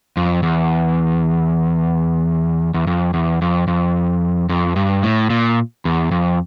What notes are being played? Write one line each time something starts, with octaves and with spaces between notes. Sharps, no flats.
F2
E2
E2
F2
E2
F2
F2
F2
G2
A2
A#2
E2
F2